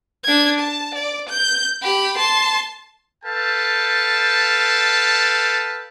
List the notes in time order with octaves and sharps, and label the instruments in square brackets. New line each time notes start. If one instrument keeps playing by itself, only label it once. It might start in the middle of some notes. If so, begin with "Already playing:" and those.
[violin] D4 G#6
A5
D5
G6
G4 B5
A5 C6
[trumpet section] A4 B4 F5 G5 A5